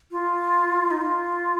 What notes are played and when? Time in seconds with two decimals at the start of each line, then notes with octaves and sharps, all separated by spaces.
0.11 F4
0.91 D#4
1.01 F4